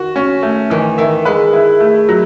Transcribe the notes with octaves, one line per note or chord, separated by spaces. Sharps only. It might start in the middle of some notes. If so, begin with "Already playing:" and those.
Already playing: D#3 F#4
C#4
A3
D#3 E3
D#3 E5
G#3 B4
E4
A3
F#3